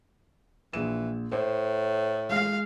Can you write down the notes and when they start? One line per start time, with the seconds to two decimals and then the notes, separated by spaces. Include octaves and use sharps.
0.73 A#1 E3 E7
1.32 A2 C5
2.30 G#3 F5